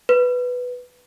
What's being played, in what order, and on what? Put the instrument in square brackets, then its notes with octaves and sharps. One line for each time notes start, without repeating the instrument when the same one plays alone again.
[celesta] B4